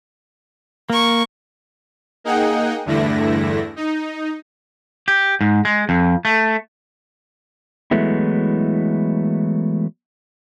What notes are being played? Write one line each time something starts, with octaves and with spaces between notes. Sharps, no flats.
A#3 A#4 C#6
A#3 D#4 G#4 D#5 F#5 G5
E2 G2 D3 A3 E4 A#6
D#4
G4
G#2
G#3
F2
A3
E3 F#3 G#3 A3 B3 E4